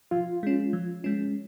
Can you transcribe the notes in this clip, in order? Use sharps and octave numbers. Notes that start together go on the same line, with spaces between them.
F3 F4
G#3 C#4
F3
G#3 C#4